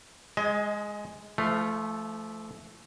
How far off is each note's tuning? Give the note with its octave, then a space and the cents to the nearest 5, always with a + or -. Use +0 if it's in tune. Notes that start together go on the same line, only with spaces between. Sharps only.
G#3 +0 D#5 +25 G#5 +45
F3 -35 A3 -5 F5 +0